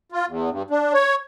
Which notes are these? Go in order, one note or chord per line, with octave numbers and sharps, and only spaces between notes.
F4
E2
G2
D4
C#5